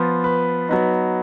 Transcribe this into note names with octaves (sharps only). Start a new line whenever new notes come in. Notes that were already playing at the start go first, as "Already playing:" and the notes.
Already playing: F3 B3 F4
B4
F#3 B3 D#4